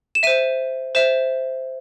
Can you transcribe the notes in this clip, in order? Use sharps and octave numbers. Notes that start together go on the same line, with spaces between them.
E7
C5 E5 D#7
C5 E5 E7